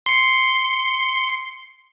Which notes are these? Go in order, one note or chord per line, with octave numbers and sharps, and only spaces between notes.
C6 C#7